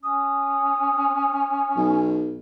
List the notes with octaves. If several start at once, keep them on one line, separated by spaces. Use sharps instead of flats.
C#4 D#6
B1